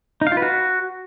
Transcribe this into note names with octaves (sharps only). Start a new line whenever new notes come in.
D#4
F5
F4
B4
F#4